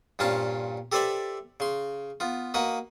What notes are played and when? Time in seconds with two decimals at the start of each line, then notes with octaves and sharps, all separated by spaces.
0.19 G2 A#2 C#4 C5 F5 A5
0.92 G4 A4 B4 C5 D5 E5
1.60 C#3 C6
2.20 B3 F4
2.54 A#3 F#4 B4 D#5